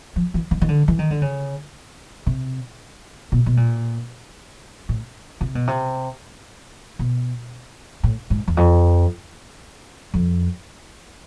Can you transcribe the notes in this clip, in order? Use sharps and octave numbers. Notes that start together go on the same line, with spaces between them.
F3
E3
D#3
D#3
D3
E3
D#3
D3
C#3
C3
B2
B2
A#2
A2
C3
B2
C3
B2
A2
G#2
E2
F2
F2